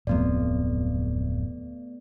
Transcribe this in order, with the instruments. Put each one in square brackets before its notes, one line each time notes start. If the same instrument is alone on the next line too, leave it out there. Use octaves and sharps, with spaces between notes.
[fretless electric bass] D1 F2 [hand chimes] A3 B3 D5